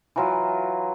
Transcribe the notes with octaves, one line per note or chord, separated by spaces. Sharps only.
E3 F#3 F4